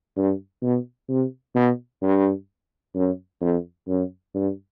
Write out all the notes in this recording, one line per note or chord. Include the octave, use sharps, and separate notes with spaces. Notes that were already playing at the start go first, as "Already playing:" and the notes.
G2
B2
C3
B2
G2
F#2
F2
F#2
G2